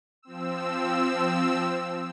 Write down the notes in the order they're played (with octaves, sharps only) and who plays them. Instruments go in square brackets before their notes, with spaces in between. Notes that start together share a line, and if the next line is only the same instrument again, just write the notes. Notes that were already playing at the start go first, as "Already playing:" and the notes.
[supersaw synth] F3 C4 E6